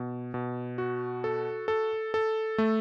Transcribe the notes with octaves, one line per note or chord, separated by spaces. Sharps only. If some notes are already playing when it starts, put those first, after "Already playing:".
Already playing: B2
B2
F#4
A4
A4
A4
A3